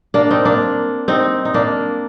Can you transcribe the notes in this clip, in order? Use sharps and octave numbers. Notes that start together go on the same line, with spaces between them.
A#3 D4
C4 D#4
A#3 D4
C4 D#4
D#4
A#3 D4